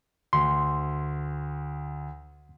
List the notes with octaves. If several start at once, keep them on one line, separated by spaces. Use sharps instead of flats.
D2 C6